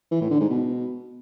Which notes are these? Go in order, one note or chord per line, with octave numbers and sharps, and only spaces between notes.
E3
A2
D3
G#2
B2